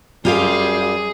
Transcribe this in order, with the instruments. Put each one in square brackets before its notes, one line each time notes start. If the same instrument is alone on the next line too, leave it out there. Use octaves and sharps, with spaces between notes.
[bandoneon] F#2 G3 [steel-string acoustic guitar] F4 G4 F5 [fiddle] G#4